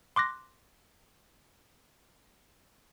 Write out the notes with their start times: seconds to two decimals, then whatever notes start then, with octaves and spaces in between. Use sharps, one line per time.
0.16 C6 D6 F#6 A#6